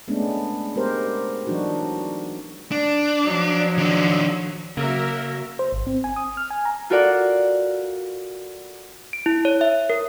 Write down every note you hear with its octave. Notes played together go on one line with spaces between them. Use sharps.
G#3 A3 B3 C#4 D4
G#3 B3 G4 A#4 C5
E3 F#3 D4 D#4 F#4
D4
F3 F#3
D#3 D4
C#3 F#3 A#3 A#4 E5
C5
G#1
C4
G#5
D#6
F6
G#5
A#5
F4 F#4 A4 A#4 D5 F#5
D7
E4
C#5
E5
A#4